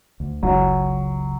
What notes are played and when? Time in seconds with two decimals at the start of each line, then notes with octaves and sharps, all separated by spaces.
0.20 D2
0.43 F#1 C#2 F#3